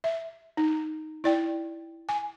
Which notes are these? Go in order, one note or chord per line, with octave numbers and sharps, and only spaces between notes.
E5
D#4
E4 D5 G5
G#5